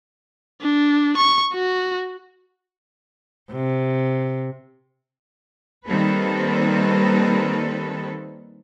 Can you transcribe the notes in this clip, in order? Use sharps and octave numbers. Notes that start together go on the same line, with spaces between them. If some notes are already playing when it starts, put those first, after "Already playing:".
D4
C#6
F#4
C3
D#3 G3 A#3 C4 A4 B4